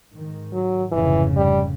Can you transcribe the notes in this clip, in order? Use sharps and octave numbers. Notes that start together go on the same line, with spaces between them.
G#2 D#3
F#3
F1 G#2 C#3 E3
G3